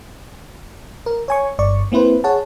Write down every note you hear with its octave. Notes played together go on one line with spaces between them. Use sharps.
A#4
C#5 G#5 C#6
G1 G2 D5 C#6
A#3 C4 E4 B4 C5
G#4 C#5 F#5 A5